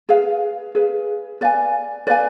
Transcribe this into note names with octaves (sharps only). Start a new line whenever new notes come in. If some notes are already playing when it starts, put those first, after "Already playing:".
G#4 B4 F5
G#4 B4 F5
B4 D5 F5 G#5
B4 D5 F5 G#5